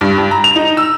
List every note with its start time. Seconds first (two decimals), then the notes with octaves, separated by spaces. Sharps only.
0.01 G2
0.18 G2
0.31 A#5
0.44 F7
0.56 D#4
0.77 E6